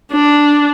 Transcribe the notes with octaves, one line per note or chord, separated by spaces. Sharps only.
D4